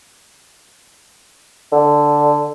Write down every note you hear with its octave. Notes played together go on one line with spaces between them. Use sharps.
D3